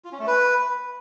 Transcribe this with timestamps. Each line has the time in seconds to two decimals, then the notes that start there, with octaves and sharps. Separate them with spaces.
0.05 F4
0.12 C#4
0.19 A3
0.27 B4